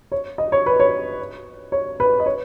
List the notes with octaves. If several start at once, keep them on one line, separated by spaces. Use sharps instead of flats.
C#5
D#5
C#5
B4
C#5
C#5
B4
D#5
C#5